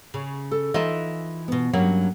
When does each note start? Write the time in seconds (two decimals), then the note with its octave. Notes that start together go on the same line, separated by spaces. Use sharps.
0.14 C#3
0.51 A4
0.74 E3 D#4 F4 D#5 E5
1.48 B2 B3
1.73 G2 F#3 A#3 C#4